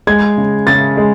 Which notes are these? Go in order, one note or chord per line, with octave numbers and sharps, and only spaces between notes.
G#3 G#6
C#3
C#3 A6
G#3